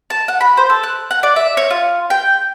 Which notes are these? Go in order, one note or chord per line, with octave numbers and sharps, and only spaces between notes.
A5
F#5
B5
C5
A4
F#6
F#5
D5
E5
C#5
F4
G5